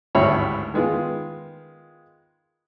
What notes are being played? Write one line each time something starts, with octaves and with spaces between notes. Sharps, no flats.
G#1 D2 G2 E4 C#5 B5
D#3 G#3 B3 F4